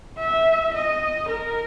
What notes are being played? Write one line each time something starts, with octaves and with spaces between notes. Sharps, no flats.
E5
D#5
A#4